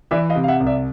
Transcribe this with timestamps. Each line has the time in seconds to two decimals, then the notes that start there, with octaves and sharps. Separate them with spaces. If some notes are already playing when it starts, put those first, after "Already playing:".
0.11 E3 D5 E5
0.29 D#5 F5
0.35 C3
0.44 F5
0.48 E5 F#5
0.60 C2
0.67 D5 E5